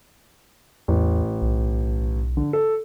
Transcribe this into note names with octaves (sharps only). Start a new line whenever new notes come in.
A1 E2
B1
D3
A4